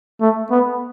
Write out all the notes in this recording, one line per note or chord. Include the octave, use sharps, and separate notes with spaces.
A3
B3